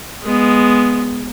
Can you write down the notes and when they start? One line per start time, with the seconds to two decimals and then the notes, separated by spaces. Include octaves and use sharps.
0.24 G#3 B3